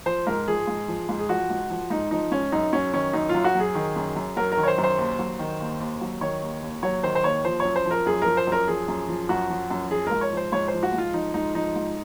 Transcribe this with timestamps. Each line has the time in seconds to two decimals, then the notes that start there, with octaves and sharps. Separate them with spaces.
0.06 F3 C5
0.27 G#2 A#4
0.47 F3 G#4
0.67 G#2
0.88 F3
1.09 G#2
1.19 G#4
1.29 F3 F#4
1.50 G#2
1.70 F3
1.90 G#2 D#4
2.11 F3 D#4
2.31 G#2 C#4
2.52 F#2 D#4
2.73 F#3 C#4
2.93 D#3 C#4
3.13 F#2 D#4
3.29 F4
3.35 F#2
3.44 F#4
3.55 F#3 G#4
3.75 D#3
3.96 F#2
4.16 F#2
4.37 F#3 A#4
4.52 A#4
4.57 D#3
4.63 C#5
4.67 C5
4.78 F#2
4.84 C5
4.98 D#2
5.19 F#3
5.39 D#3
5.60 D#2
5.80 D#2
6.01 F#3
6.21 D#3 C#5
6.42 D#2
6.63 D#2
6.83 F#3 C#5
7.03 D#3 C5
7.15 C5
7.24 D#2 C#5
7.45 F3 C5
7.60 C#5
7.65 F#2
7.76 C5
7.86 F3 A#4
8.06 F#2 G#4
8.22 F3 A#4
8.37 C5
8.47 F#2 A#4
8.68 F3 G#4
8.88 F#2
9.09 F3
9.29 F#2 F#4
9.50 F3
9.70 F#2
9.91 F3 G#4
10.07 G#2 A#4
10.21 C#5
10.32 F3
10.37 C5
10.52 G#2 C#5
10.68 C5
10.73 F3
10.83 F#4
10.93 G#2
10.98 F4
11.14 F3 D#4
11.34 G#2 D#4
11.55 F3 D#4
11.76 G#2